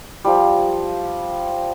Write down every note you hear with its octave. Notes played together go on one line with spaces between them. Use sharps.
F3 G3